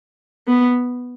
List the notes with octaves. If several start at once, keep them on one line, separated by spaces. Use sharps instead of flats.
B3